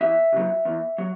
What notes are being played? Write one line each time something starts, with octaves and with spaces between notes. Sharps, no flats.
E2 E5
C#3 F#3
E2
F#3